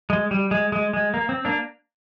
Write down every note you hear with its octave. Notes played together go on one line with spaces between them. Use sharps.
G#3
G3
G#3
G#3
G#3
A#3
C4
A#3 D4